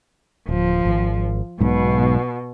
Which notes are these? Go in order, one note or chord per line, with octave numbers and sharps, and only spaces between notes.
D1 F3
G#1
B1 G#2 B2